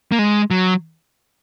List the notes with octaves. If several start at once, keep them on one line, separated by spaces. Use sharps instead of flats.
A#3
G#3
F#3